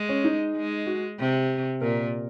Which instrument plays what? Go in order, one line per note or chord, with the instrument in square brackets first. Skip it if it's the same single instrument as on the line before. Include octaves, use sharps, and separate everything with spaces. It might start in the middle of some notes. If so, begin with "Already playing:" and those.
Already playing: [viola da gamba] G#3
[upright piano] C#4
D#4
[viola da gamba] G#3
[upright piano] F#4
[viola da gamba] C3
[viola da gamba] A#2 [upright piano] A#4